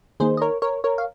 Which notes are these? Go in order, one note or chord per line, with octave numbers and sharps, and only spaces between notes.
D#3 A#3 D#4 G#4 C5
D#5
A#4 C#5
A#4 C#5
A#4 C#5
F5